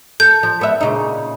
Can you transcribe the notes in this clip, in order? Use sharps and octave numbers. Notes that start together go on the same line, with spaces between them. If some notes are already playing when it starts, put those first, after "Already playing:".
A4 G6
F3
B3 E5
A#2 C#3 D#4